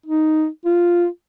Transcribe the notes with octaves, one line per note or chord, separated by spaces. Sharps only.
D#4
F4